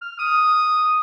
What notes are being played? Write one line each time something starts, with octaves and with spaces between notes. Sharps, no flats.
F6
D#6